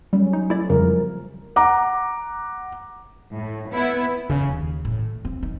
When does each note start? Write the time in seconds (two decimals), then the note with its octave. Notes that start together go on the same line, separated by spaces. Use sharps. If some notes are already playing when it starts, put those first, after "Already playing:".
0.13 F#3 G3 C#4
0.33 D#4
0.50 A3 E4 D5
0.70 F2 C#3 F3 G3 A#4
1.56 F#5 A#5 D6
3.34 A2
3.71 B3 E4
4.30 C#3
4.49 D#2
4.85 A2
5.25 C4
5.43 D#4